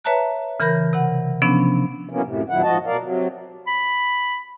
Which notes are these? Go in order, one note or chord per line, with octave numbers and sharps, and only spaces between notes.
B4 C#5 E5 A5 A#5 F#6
C#3 E3 A#4 B5 G6 A#6
C3 F#5
C3 F3 B3 C#4 D4
E3 F#3 A#3 B3 C#4
F#2 A2 C3
F2 A#2 D#3 F#3 E4 F#5
G#2 F3 F#4 D#5 A5
B2 A#4 D5 F5
C3 F#3
B5